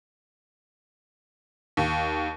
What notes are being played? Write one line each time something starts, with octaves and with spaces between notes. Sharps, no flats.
D#2